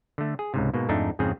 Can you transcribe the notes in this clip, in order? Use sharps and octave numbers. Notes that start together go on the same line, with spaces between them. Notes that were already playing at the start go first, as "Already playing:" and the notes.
D3 A3
G#4
C#2 G#2 C3
G#2 B2 A#3
F2 G#2 A3 D4 D#4
F2 G#2 C#3 C4 G#4